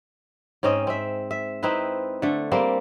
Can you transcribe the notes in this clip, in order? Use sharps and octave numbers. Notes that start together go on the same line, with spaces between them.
G#2 C4 C#4 D#5
C4 E5
E5
C4 D#4 E4 B4
D3 A3
G3 A#3 C4